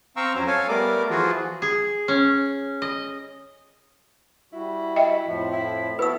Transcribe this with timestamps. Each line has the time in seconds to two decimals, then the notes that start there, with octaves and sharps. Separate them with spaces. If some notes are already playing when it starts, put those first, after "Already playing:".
0.16 C4 F5 G5 A#5 C#6 E6
0.35 F2 F#3 C#4 C5
0.47 A4 C#5 F5 G#5
0.69 G3 A3 B3 A#4 D5 D6
1.11 E3 F3 F4 F#4 G#4
1.62 G#4
2.08 C#4
2.82 D#5
4.52 G3 E4 F#4
4.96 D#5 E5 G5
5.26 F2 A2 F3
5.52 E4
5.99 B3 E4 F#4 A4 B4 E6